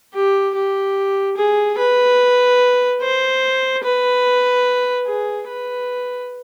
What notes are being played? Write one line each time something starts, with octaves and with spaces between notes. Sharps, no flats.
G4
G4
G#4
B4
C5
B4
G#4
B4